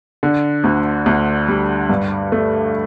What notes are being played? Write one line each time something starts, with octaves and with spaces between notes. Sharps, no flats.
D3
D2
D2
G3
G2
A3